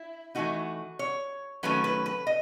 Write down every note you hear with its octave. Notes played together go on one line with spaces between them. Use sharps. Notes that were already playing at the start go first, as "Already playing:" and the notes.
Already playing: E4
E3 A3 D#4 F#4
C#5
D#3 F#3 A3 C#4 B4
B4
B4
D#5